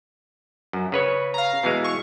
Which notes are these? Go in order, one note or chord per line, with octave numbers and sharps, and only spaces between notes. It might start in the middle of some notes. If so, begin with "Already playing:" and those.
F#2
C#3 B4 C#5
F5 A#5
B2 E3 G#3
C#6